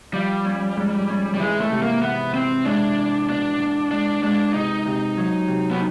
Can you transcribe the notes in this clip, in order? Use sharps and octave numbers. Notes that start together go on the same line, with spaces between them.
F3 G3
C#4
G#2
C#4
G3
E3 G#3
A3
C3
A#3
E3 B3
E3 C4
G#3 D4
E2
B2 D4
B2
G#3 D4
G#3 D4
C3 D#4
C3
F#3
C3
B3